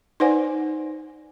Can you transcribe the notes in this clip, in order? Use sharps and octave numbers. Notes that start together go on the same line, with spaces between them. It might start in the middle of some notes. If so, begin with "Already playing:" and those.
D#4 B4 C5 D5 F#5 G#5